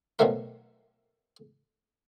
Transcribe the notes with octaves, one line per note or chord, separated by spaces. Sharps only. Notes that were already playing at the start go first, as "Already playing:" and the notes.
B2 D#3 F3 F#3 A3 A#4